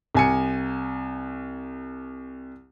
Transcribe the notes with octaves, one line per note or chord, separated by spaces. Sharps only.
C2 G#5 C#7